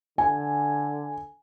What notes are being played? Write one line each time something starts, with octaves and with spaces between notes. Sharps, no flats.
D3 G#5